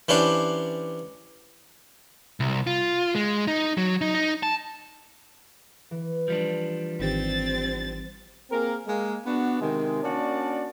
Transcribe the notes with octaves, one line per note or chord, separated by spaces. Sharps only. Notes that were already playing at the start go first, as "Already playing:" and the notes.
E3 C#4 D4 G4 C5 F#5
C2
F4
G#3
D#4
F#3
D#4
D#4
A5
E3
F3 G3 D4
G#1 D#3 C4 G4 A6
A#3 C4 G#4 A#4
G#3 A#3
B3 D4 F#4
C3 D#3 G#3
A#3 C#4 D4 F#4 D5 A5